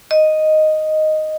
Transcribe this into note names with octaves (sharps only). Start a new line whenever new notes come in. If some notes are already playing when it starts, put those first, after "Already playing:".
D#5